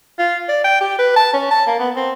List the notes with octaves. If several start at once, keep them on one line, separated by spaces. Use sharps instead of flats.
F4
D5
G5
G4
B4
A5
C#4
A5
A#3
B3
C4